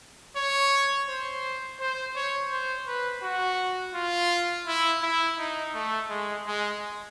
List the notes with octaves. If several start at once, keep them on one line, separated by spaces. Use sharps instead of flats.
C#5
C5
C5
C#5
C5
B4
F#4
F4
E4
E4
D#4
A3
G#3
G#3